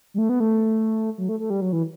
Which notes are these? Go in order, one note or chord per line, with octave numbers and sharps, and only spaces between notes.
G3
A3
B3
A3
F#3
A3
A3
G3
F#3
E3